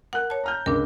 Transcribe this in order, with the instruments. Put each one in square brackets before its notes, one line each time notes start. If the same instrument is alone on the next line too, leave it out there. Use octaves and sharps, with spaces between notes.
[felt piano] A#4 F#6 [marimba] F#5
[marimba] C#5 A5
[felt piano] A#5 F6 G6
[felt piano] C#2 [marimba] D4 A#4